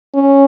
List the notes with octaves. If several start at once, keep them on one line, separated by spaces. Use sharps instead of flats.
C#4